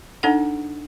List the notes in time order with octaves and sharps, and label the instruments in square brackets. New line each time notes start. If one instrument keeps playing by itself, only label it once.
[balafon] D4 D#4 A4 F#5